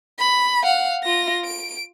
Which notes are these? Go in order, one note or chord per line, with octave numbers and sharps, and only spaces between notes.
B5
F5 F#5
F4 A#6
D7